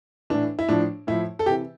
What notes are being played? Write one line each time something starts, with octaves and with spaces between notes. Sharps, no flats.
A2 E3 D4
E4
A2 F3 D4
A2 F3 E4
A4
C3 E3 G4